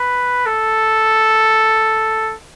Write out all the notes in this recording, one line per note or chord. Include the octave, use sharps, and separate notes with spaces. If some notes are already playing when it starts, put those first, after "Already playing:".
Already playing: B4
A4